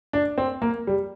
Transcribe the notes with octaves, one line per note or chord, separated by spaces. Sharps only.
D4
C4
A#3
G3